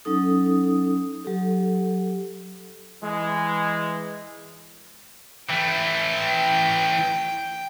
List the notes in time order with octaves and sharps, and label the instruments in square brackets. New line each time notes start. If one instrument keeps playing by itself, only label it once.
[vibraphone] F#3 C#4 D#4 A4 D#6
F#3 G4 A4
[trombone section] E3 G#3
[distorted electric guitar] E3 A3 [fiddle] G5